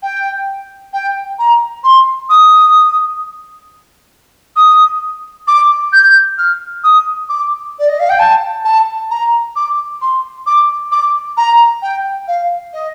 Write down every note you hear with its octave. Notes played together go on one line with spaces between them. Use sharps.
G5
G5
A#5
C6
D#6
D#6
D6
G6
F6
D#6
D6
D5
D#5
F5
G5
A5
A5
A#5
D6
C6
D6
D6
A#5
G5
F5
D#5